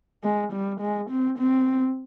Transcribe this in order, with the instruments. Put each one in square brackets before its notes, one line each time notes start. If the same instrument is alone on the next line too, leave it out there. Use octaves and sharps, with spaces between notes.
[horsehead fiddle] G#3
G3
G#3
C4
C4